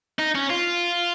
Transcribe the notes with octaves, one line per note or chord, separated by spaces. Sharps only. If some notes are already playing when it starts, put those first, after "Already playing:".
D#4
C#4
F4